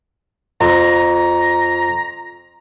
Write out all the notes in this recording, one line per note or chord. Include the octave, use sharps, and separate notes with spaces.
F2 A#5